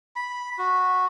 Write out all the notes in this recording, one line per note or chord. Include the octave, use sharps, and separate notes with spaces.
B5
F#4